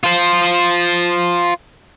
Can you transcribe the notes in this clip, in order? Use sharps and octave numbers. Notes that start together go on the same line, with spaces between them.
F4 C5